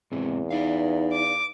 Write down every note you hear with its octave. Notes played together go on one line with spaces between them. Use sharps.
E2 G#2 C3 C4
D#4 B4 D5 F5
D6